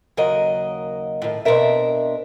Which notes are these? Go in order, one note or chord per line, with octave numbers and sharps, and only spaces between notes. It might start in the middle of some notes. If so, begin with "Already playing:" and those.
D#2 C#3 F#3 A#4 D#5 F#5
A2 D#3
B2 C4 D4 A#4 E5